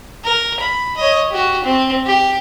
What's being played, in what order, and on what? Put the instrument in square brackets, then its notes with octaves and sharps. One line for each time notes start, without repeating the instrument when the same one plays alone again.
[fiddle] A#4
B5
C#5 D#5
F#4 G4
C4
G4